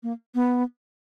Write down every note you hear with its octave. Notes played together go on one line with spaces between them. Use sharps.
A#3
B3